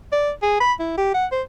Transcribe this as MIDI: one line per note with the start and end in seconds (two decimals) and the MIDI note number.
0.12 0.31 74
0.42 0.58 68
0.60 0.72 83
0.80 0.97 64
0.98 1.13 67
1.14 1.26 78
1.32 1.42 72